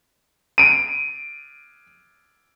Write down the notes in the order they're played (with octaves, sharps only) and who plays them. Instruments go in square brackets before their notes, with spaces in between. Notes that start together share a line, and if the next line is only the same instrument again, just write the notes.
[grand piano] D7 D#7